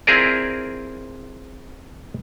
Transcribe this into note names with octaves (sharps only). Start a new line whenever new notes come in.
C4 E4 F4 G#4 A#4 D5